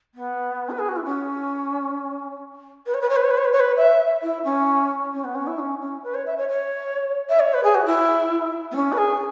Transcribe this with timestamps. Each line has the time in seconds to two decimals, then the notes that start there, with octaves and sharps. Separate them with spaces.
0.15 B3
0.70 B4
0.79 G#4
0.89 F#4
0.96 E4
1.05 C#4
2.86 B4
2.94 C#5
3.01 B4
3.09 C#5
3.16 B4
3.24 C#5
3.30 B4
3.37 C#5
3.45 B4
3.52 C#5
3.60 B4
3.77 E5
4.22 E4
4.44 C#4
5.13 C#4
5.24 B3
5.35 C#4
5.47 E4
5.58 C#4
5.81 C#4
6.03 B4
6.14 C#5
6.26 E5
6.37 C#5
6.48 C#5
7.29 E5
7.39 C#5
7.54 B4
7.63 G#4
7.74 F#4
7.85 E4
8.72 B3
8.76 C#4
8.92 B4
8.97 G#4